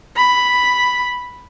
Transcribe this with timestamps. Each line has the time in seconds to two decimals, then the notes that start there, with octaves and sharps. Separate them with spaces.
0.17 B5